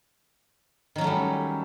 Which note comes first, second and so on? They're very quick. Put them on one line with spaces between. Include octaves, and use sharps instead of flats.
D#3 F#3 C#4 A3 G3